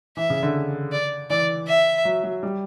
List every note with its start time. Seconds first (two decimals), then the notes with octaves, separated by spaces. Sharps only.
0.17 E3 E5
0.30 C#3
0.43 D3
0.93 D5
1.30 E3 D5
1.68 E5
2.05 F#3
2.24 F#3
2.43 G3